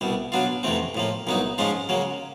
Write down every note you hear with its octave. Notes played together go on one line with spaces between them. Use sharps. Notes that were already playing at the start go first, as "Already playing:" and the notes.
C2 B2 G3
B2 F#3 B3 D4 F4
F2 C3 E3 A3 C4
A2 F3 A#3
C2 A#2 F#3 B3 D#4
G#2 F3 G#3 C#4 F4
C#3 F#3 A#3